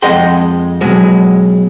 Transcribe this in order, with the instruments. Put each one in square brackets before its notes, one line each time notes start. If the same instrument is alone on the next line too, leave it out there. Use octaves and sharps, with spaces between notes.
[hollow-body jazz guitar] F2 G#3 D#5 F#5 G5 C6
B2 F#3 G#3